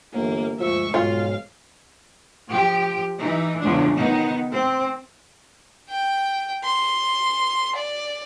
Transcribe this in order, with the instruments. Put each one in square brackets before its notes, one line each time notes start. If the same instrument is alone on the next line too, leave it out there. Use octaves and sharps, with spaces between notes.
[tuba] G1 [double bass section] E3 [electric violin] A#3
[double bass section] D2 G2 G#3 [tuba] F3 [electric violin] E5 C#6
[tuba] B1 [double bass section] G#2 F3 G#3 [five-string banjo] F4 [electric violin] F5
[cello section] F3 G4
E3 D#4
E2 C#3 F3 G#3 D4
D#3 B3 D#4
C4
[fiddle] G5
C6
D5